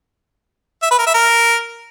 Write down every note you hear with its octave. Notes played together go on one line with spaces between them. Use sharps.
E5
B4
A#4
E5
A#4